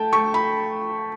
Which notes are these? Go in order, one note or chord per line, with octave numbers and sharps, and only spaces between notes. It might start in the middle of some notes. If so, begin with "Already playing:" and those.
Already playing: A3 G5 A5
A3 C#6
B5